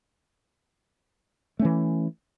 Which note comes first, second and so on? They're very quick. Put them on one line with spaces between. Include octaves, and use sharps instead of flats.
A3 C#4 E3